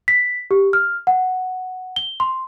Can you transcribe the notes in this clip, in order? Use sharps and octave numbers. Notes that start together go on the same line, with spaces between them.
B6
G4
F6
F#5
G7
C6